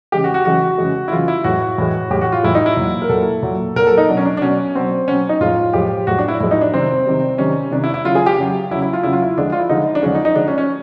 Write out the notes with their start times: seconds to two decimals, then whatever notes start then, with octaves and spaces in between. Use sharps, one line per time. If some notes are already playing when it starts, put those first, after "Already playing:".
0.12 C#3 E3 G#3 G4
0.24 F#4
0.34 F#4
0.45 C#3 E3 G#3 F#4
0.78 C#3 E3 G#3
1.08 E4
1.12 C#3 E3 G#3 F4
1.28 E4
1.44 A2 E3 G#3 F#4
1.78 A2 E3 G#3
2.10 A2 E3 G#3 G4
2.21 F#4
2.32 F4
2.43 A2 E3 G#3 E4
2.55 D#4
2.66 E4
2.77 A#2 F#3
3.02 A#4
3.09 A#2 F#3 A4
3.42 A#2 F#3
3.76 A#2 F#3 A#4
3.87 A4
3.97 D#4
4.09 B2 F#3 D4
4.17 C#4
4.25 D4
4.37 D4
4.41 B2 F#3 C#4
4.75 B2 F#3 C4
5.08 B2 F#3 C#4
5.29 D#4
5.40 A2 F3 G#3 F4
5.73 A2 F3 G#3 G4
6.07 A2 F3 G#3 F#4
6.18 D4
6.28 E4
6.40 A2 F3 G#3 E4
6.51 D#4
6.61 D4
6.72 C3 D#3 G3 C4
7.07 C3 D#3 G3
7.38 C3 D#3 G3 C#4
7.71 C3 D#3 G3 D4
7.84 E4
7.94 E4
8.05 C#3 F#3 F4
8.15 G#4
8.26 G4
8.38 C#3 F#3
8.71 F#3 E4
8.75 C#3
8.82 E4
8.93 F4
9.03 C#3 F#3 E4
9.13 F4
9.22 E4
9.37 D3 F3 G#3 D4
9.52 F4
9.60 E4
9.69 D3 F3 G#3 D#4
9.95 D4
10.02 D3 F3 G#3 C#4
10.15 D#4
10.25 D#4
10.35 D3 F3 G#3 D4
10.48 C#4
10.58 C#4